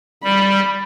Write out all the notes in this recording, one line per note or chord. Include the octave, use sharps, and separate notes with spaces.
G3 B5